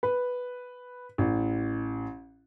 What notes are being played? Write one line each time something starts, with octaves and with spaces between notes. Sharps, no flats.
B4
A1